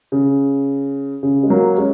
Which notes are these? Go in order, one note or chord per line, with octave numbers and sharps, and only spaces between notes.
C#3
C#3
G#3
F#3 A#3
G#3 C#4